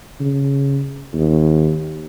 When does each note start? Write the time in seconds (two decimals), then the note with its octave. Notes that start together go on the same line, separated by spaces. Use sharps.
0.20 C#3
1.13 D#2